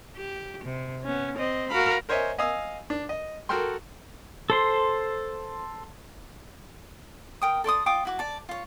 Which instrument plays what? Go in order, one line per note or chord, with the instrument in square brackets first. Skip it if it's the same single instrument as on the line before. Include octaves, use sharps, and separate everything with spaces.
[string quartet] G4
C3
B3 C#4
C4 D#5
F#4 A#4 F5 A#5 B5
[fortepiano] A#4 C5 C#5 D#5 E5 G#5
D#5 F5 G#5 D#6 E6
D4
D#5
F#4 A4 A#4 G5 C6
[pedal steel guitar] A4 C5 C6
[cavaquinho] A#4 G5 D#6
A4 D5 C6 D#6
F4 G5 D6 D#6
E4 F#4 D6
D5 A5
F4 C#5